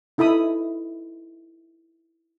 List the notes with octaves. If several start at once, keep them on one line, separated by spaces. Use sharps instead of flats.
D#4 E4 A4 B5 D#6